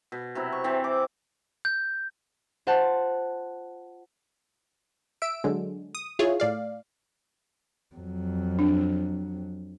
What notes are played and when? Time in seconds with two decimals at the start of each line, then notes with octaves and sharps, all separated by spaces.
0.12 B2
0.35 C3 F#3 E4
0.52 C#6
0.64 C3 E3 C4
0.84 D6
1.65 G6
2.67 F4 C5 F#5 A5
5.22 E5 E6 D7
5.44 D3 F#3 G#3
5.95 D#6
6.19 E4 F4 G#4 C#5
6.40 A2 D5 F5
7.95 F2 F#3
8.59 D4